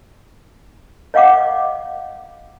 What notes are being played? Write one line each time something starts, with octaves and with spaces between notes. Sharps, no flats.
C#5 D#5 F5 F#5 D6